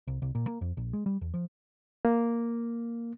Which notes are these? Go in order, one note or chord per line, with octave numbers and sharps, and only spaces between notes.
C2
C2
A#2
A#3
F2
A#1
G#3
G3
E2
F3
A#3